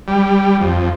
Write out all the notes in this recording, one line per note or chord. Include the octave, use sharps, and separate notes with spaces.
G3
F2